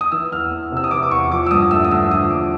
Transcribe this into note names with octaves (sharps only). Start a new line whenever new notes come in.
D#6
E3 E6
E2 F6
E2
C3 E6
D#6
E3 D6
D6
E2 C#6
F3 D6
E6
G2 D#6
A3 E6
D#6
D3 E6
F3 D#6
G2 D6